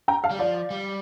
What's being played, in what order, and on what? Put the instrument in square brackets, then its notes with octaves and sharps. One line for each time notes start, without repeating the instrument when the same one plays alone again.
[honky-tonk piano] G5 A#5
F5 A5
[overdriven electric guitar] G3
[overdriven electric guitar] F3 [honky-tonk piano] D5 F5
[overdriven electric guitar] G3